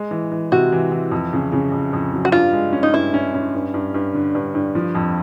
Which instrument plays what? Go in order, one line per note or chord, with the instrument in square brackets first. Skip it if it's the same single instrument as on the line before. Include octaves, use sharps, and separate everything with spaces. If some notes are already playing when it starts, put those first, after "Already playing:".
Already playing: [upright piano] G#3
E3
E3
[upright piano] C3 [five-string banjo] F#4
[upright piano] E3
E3
F2
C#3
C#3
F2
F2
F#3
[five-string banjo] F#4
[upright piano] G2 [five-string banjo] F4
[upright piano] G#3
C#4
[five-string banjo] D#4
[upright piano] G2 [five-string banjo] E4
[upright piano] C#4
C#4
G2
G2
G2
D3
G2
G2
F3
F2